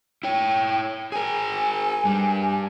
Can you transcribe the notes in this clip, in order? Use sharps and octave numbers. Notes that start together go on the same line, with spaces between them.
E4 C#5 G5
G#4 A#4 G#5
G2 G3